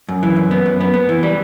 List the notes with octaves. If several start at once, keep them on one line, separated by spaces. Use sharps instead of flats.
F#2
E3
F#2
B3
F#2
B3
B3
E3
G3